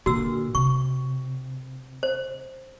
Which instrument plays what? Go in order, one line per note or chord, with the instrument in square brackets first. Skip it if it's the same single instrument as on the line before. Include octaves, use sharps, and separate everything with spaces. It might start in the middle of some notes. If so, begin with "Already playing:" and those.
[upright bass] A#2 D3 [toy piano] F#4 E6
[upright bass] C3 [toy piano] C#6
[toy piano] C5